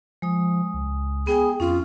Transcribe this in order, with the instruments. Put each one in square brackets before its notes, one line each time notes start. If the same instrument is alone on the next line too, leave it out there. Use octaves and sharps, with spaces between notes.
[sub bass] F3 [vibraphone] G#3 D#6
[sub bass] C#2
[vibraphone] B3 G5 D#6 [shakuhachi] G#4
[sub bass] F2 [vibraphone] C#4 [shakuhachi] F4